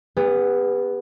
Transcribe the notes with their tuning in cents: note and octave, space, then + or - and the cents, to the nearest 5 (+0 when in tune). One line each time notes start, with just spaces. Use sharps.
B3 +0 G4 +45